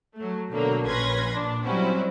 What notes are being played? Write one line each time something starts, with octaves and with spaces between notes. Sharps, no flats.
F#3 A3
B2 D3 F#3 A#3
A#1 C#4 B4 C6 G#6 A#6
A#2 D4
F#3 G3 C4 C#4 E4 F#4